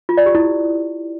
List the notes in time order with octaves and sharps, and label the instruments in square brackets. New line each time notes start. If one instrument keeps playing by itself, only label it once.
[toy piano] F4
D5
G4
E4